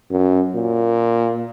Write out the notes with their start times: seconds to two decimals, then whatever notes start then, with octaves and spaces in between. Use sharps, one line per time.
0.11 F#2
0.55 A#2